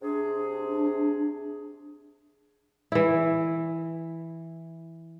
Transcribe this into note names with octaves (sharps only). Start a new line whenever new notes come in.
C3 D4 G#4
E3 E4